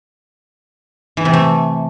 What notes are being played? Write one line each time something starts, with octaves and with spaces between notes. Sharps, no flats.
E3
C3
A3